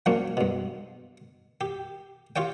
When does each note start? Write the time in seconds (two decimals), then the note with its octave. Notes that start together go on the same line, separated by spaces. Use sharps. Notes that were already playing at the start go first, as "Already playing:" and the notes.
0.06 F3 F#3 A#3 C#4 D4
0.37 G2 B2
1.61 G4
2.36 F4 G4 C#5 G5